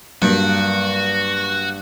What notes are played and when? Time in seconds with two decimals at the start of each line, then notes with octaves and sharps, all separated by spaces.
0.22 G2 F#3 A#3 F#4